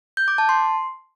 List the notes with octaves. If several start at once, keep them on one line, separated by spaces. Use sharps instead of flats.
G6
D6
A5
C6